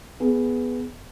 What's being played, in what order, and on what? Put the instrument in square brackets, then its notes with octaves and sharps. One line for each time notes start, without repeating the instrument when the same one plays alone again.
[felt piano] B3 G#4